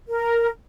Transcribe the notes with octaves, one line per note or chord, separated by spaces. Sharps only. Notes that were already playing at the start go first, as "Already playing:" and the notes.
A#4